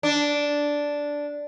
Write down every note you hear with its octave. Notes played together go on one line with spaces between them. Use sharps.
D4